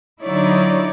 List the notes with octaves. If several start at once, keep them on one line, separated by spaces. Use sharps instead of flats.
D3 F#3 D#4 E4 C#5 D5